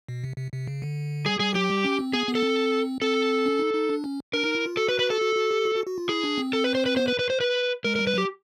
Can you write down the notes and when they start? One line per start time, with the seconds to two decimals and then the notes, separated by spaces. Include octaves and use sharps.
0.08 B2
0.24 C3
0.37 C3
0.52 C3
0.68 C#3
0.82 D3
1.25 G3 G#4
1.40 G3 G#4
1.54 F#3 G4
1.70 G3
1.84 C#4
1.99 C4
2.13 B3 G#4
2.27 B3
2.35 A4
2.43 C4
3.01 C4 A4
3.46 C#4
3.59 D#4
3.74 D#4
3.89 D4
4.04 C#4
4.33 D4 A#4
4.44 D#4
4.55 E4
4.66 F4
4.77 F#4 A4
4.88 B4
4.99 B4
5.10 A4
5.21 F#4
5.36 F#4
5.51 G4
5.65 F#4
5.76 F#4
5.87 F#4
5.98 F4
6.09 E4 G#4
6.24 D4
6.38 C4
6.53 A4
6.64 B4
6.75 C5
6.86 B4
6.96 B3 C5
7.08 B4
7.19 B4
7.30 C5
7.41 B4
7.84 G#3 A#4
7.96 A#4
7.99 G3
8.07 B4
8.14 F#3 G4